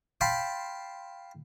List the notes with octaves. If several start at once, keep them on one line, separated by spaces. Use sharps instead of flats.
F5 G5 A5 B5 C6